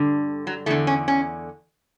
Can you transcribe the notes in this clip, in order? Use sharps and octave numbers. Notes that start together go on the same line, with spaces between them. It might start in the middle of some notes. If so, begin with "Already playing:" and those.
Already playing: G2 D3
F#3
E2 D3 A3
C#4
C#4